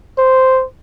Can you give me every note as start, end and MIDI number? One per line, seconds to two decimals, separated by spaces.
0.18 0.64 72